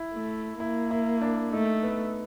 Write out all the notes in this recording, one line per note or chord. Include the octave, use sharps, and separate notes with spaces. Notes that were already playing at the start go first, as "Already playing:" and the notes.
Already playing: E4
A3
A#3 E4
E4
D4
A3 D#4
B3